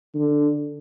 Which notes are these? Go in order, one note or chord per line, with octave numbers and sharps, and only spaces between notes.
D3